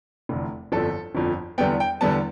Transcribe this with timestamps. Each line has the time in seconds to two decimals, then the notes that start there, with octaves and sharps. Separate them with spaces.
0.29 F1 E2 D3
0.72 G1 F2 D3 F3 A4
1.15 G1 F2 D3 F3
1.58 E2 D3 G3 B3 G5
1.80 G5
2.01 E2 D3 G3 B3 A5